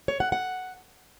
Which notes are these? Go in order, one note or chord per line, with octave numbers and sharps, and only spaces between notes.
C#5
F#5
F#5